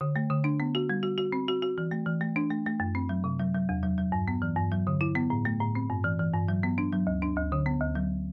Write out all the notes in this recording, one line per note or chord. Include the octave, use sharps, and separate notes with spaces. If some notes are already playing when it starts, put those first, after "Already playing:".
D3
A3
D3
D4
B3
F#4
G3
F#4
F#4
C4
F#4
F#4
E3
A3
E3
A3
D4
A3
A3
F#2
C4
F#3
C3
F#3
F#3
E2
F#3
F#3
G2
B3
E3
G2
F#3
D3
E4
B3
A2
A3
A2
C4
G2
E3
E3
G2
F#3
B3
D4
F#3
D2
D4
D2
D3
B3
D2
F#3